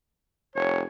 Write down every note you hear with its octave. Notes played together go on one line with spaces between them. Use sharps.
F1 C#5